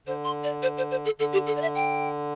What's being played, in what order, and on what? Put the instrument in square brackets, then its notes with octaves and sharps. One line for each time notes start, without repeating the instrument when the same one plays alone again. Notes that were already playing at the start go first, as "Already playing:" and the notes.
[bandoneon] D3 [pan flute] C5
[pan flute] C6
D5
C5
C5
C5
A4
[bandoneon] D3 [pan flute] A4
[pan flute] G4
A4
D5
E5
G5